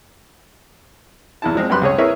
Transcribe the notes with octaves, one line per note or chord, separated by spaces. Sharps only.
E2 E4 A5
F3 G#3 C4
F#2 G3 B3 B5 C6 F#6
C#2 G#4 C#5
E4 G#4 A#4 B4 C#5 E5